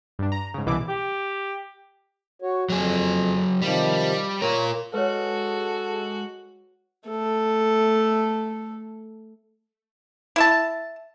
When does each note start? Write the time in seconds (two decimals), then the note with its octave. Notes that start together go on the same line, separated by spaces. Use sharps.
0.19 G2 D4
0.32 A#5
0.54 G#2 C#3
0.66 C2 B2 E3 E4 D6
0.88 G4
2.42 F#4 C#5
2.70 F2 F#3 G#4
3.62 C3 D#3 F3 G3
4.42 F4 A#4 C#5
4.94 G#3 F#4 G#4 A4 B4 C#5
7.08 A3 A4
10.36 E4 E5 A5